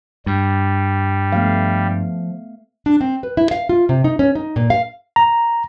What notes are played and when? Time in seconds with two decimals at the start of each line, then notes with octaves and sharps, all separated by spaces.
0.26 G2 G3
1.32 F3 A3 B3 F5
2.86 D4
3.01 C4
3.23 B4
3.37 E4
3.51 F5
3.69 F4
3.89 C3
4.04 D#4
4.19 C#4
4.35 D#4
4.56 A#2
4.70 F5
5.16 A#5